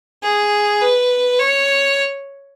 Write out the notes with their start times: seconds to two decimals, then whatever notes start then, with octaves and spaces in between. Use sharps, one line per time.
0.23 G#4
0.81 B4
1.40 C#5